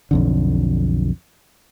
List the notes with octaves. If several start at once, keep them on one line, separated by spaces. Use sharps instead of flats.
B1 F2 D3